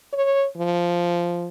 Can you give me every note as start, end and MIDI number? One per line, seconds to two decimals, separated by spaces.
0.13 0.46 73
0.57 1.49 53